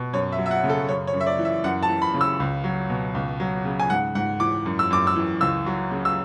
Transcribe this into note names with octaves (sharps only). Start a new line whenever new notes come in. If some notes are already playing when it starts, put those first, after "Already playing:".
Already playing: B2
F#2 C#5
E5
F#3
E5
F#5
C#3
A4
F#2 C#5
C#5
F#2
E5
D5
E3
E5
F#2 F#5
A5
E3
B5
C#3
E6
C#2
F#3
B2
C#2
F#3
C#3
G#5
G#2 F#5
G#2 F#5
E3 D6
F#2
E6
F#2 D6
E6
E3
C#2 E6
F#3
C#3
E6